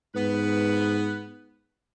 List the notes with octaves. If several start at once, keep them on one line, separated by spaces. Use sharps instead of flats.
G#2 B3 B4